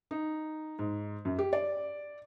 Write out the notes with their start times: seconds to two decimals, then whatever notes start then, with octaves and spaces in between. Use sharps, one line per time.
0.11 D#4
0.79 G#2
1.25 F#2
1.39 G4
1.53 D5